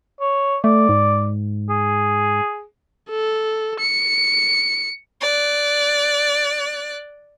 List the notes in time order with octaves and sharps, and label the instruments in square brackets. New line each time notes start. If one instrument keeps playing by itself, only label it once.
[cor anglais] C#5
[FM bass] A3 [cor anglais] D5
[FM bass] G#2
[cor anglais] G#4
[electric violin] A4
C#7
[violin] D5 F#6